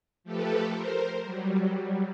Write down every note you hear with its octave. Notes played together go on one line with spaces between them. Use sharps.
F3 A3 G4 A4 B4
A#4 C5
F#3 G3